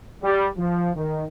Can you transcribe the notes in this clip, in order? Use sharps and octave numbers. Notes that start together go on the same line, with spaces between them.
G3
F3
D#3